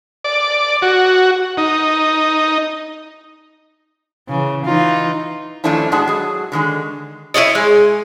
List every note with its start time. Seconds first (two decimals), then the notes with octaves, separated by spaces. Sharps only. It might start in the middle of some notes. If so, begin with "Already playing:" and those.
0.24 D5
0.82 F#4
1.57 D#4
4.28 C#3 E3
4.66 E3 D#4 F4
5.64 D#3 F3 A3 C#4 D4 E4
5.92 A2 G#3 D4 F#4 G#4 A5
6.07 F#3 G#4
6.52 D3 D#3 G#3
7.34 E4 F#4 C#5 D#5
7.55 G#3